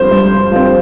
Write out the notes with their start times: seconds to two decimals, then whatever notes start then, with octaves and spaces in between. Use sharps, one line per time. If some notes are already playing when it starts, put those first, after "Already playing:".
Already playing: G2 F3 C4 C5
0.11 G2
0.52 F3 C4